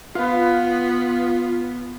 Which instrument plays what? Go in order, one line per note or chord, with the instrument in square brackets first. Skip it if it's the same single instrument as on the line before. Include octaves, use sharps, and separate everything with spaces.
[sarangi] B3 [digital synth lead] F4 [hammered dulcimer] B4 F5